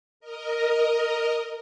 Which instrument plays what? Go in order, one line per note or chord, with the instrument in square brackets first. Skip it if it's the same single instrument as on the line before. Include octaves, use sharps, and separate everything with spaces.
[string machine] A#4 D#5